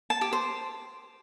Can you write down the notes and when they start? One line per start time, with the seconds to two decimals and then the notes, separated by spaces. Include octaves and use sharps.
0.10 A5
0.21 G4
0.33 C5